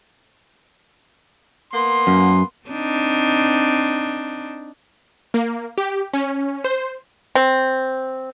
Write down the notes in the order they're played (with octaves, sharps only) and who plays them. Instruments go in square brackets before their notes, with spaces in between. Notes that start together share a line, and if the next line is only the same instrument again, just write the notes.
[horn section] A#3 B3 C6
[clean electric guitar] F#2
[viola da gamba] C4 D4 D#4
[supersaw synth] A#3
G4
C#4
C5
[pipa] C4